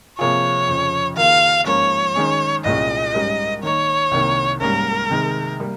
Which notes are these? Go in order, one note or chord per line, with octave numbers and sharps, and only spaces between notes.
C3 F3 A#3 F4 G#4 C#5
F2 C#3 F3
D#3 A#3 F4 G#4 F5
G#2 F3 A#3 C#4 F4 C#5
D#3 G#3 C#4 G#4
C2 A#2 G#3 C#4 D#5
G#2 G3 C#4 G4 A#4
D#3 A#3 D#4 C#5
C2 C3 D#3 A#3
G#2 G3 A#3 C#4 A#4
C3 D#3 G#3
G3 A#3